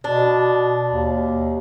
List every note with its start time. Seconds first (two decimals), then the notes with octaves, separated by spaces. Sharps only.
0.04 B2 D4
0.92 D#2